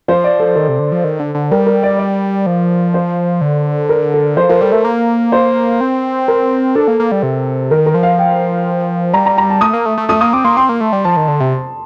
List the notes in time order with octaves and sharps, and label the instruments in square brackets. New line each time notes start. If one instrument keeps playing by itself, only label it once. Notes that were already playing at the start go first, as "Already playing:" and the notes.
[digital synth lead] F3 [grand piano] C5
[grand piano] D5
A4
[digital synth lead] D#3 [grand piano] A4
[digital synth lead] C3
D3
F3
D#3
D3
D3
[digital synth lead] G3 [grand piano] A#4
[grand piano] A#4
D5
D5
[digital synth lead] F3
[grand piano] C5
[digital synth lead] D3
[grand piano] A#4
A4
[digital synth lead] F3 [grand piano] C5
[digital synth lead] F3 [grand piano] A#4
[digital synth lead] G3 [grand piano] A4
[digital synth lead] A3 [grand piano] A#4
[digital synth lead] A#3
[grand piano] C5
[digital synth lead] C4
[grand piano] A#4
[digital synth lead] D4 [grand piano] A4
[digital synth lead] A#3
A#3
G3
C3
[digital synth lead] D#3 [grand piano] A#4
[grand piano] A#4
[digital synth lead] F3
[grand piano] F5
G5
[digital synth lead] G3 [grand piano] A#5
[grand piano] A#5
A#5
A5
[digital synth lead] A3 [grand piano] D#6
[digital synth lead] A#3
A3
A3
[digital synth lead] A3 [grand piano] D#6
[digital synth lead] A#3 [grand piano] D#6
[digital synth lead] C4 [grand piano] D6
[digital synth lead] A#3 [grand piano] C6
[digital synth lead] C4 [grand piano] C6
[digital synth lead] A#3
A3
G3
[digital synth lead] F3 [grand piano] A5
[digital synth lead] D#3
D3
C3